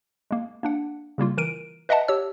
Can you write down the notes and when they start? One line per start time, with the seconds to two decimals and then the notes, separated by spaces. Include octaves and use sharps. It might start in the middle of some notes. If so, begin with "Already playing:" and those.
0.31 G#3 A#3
0.63 A#3 D4 F#5
1.18 C#3 G3 A#3 F4
1.38 E3 A#4 D7 D#7
1.89 B4 D#5 E5 F#5 A5
2.08 G4 C#5 E6